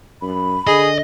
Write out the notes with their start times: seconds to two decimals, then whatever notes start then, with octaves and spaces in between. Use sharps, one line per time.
0.22 F#2 B5
0.67 D3 G#4 D#5